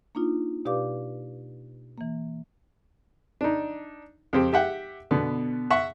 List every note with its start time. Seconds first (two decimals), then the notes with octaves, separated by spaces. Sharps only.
0.15 A#3 D4 D#4 F4
0.65 B2 G4 B4 D5 F5 D6
1.98 E3 A#3
3.41 D4 D#4
4.33 F2 C4 G4
4.53 G4 E5 F#5 G5
5.11 B2 D3 B3
5.71 E5 F#5 C#6